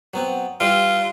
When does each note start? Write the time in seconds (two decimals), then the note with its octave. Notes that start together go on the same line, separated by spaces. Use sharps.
0.14 F#3 B3 C4
0.61 E3 G3 F4